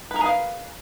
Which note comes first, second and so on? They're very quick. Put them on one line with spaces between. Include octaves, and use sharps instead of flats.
B4 A#4 G#4 F5